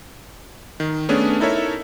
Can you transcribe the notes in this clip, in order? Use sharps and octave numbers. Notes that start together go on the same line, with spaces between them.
D#3
A3 B3 C#4 D4 G#4
D#4 E4 A4 A#4 C#5 E5